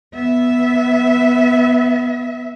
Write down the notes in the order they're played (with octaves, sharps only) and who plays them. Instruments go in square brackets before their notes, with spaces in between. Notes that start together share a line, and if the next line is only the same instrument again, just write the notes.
[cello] B3 E5